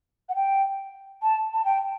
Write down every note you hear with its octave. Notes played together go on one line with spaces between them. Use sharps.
F#5
G5
A5
A5
G5